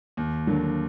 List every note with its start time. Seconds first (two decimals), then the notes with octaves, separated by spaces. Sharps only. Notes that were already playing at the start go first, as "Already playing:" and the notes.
0.17 D#2
0.47 D3 F#3 A#3 D4